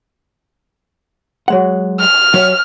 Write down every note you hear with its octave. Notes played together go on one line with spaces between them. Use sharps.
F#3 G#3 F#5
F6
F#3 C#5 E5